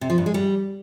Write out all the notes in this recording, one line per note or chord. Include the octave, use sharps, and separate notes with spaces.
C3
F3
G2
G#3
G3